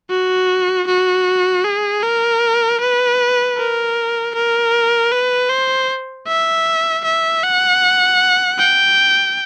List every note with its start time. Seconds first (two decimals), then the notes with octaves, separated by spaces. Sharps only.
0.10 F#4
0.87 F#4
1.65 G#4
2.03 A#4
2.81 B4
3.57 A#4
4.35 A#4
5.12 B4
5.50 C5
6.27 E5
7.04 E5
7.43 F#5
8.59 G5